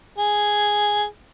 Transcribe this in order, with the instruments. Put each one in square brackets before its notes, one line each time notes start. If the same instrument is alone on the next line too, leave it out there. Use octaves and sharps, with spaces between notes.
[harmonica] G#4